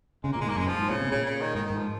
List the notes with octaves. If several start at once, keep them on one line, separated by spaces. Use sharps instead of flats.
C#3 G#3
A#2 A#3
G#3
G#2 A#3
F#2 G#3
A#2 F3
G#2
A#2 C#3
C3
A#2 C#3
C#3
D#3
G#2 D#3
G#2 D#3
F3